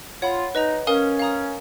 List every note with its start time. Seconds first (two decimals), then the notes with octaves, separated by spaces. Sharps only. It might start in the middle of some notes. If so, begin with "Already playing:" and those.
0.22 F4 C#5 F#5 B5
0.55 D#4 B4 D#5 A#5
0.87 C#4 A#4 F5 G#5 D#6
1.19 F5 A#5 D#6